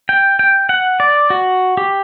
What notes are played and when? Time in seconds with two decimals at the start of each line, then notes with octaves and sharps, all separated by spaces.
0.09 G5
0.39 G5
0.69 F#5
1.00 D5
1.30 F#4
1.77 G4